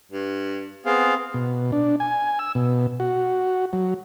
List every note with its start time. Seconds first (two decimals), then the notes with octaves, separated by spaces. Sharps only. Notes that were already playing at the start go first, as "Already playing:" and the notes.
0.12 G2
0.85 B3 C4 G#4 F5
1.34 B2
1.72 D4
2.00 G#5
2.39 E6
2.55 B2
3.00 F#4
3.73 F#3